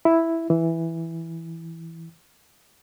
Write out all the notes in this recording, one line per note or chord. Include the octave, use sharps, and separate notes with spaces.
E4
E3